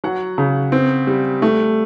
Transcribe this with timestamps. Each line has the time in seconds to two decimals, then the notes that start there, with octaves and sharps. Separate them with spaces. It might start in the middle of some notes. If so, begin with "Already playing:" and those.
0.04 F#3 F#5
0.38 C#3
0.72 C4
1.07 G3
1.42 A3